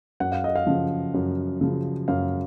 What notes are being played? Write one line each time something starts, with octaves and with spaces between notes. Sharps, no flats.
F#2 F#5
F5
D#5
F5
C#3 F3
F#2
C#3 F3
F#2 F5